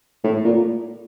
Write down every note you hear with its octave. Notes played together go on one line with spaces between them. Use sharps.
A2
A#2